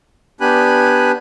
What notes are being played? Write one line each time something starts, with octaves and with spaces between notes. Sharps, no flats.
B3 D4 G4 G#5 B5 F#6